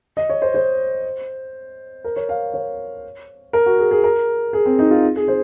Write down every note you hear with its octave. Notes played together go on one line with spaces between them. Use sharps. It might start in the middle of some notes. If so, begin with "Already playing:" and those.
D#5
C#5
C5
C5
A#4
C#5
F5
C#5
A#4
F#4
G#4
G#4
A#4
G#4
C4
D#4
F4
G#4
C5